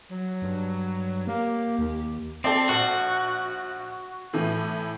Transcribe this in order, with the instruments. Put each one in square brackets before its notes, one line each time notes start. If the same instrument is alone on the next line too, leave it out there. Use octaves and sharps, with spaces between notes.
[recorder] F#3
[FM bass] G2
[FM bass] A#3 [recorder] G4
[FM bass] D#2
[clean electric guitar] C4 [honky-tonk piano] A4 D5
[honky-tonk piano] A#1 [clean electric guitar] F#4
[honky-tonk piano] A2 E3